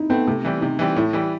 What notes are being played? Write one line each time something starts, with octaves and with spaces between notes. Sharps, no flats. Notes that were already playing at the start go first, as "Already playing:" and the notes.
Already playing: D#4 E4
A3 B3 C4
C3 A3
E3 G3 C4
C3 D#4
E3 G3 C4
A2 E4
E3 G3